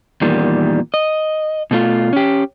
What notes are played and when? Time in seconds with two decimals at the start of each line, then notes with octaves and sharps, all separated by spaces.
0.21 E2 A#2 D#3 G3
0.94 D#5
1.71 B2 A3 F4
2.13 C#4 G4